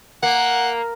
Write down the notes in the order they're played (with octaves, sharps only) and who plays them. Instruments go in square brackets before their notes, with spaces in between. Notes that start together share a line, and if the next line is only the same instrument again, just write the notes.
[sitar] A#3 [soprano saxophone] F#5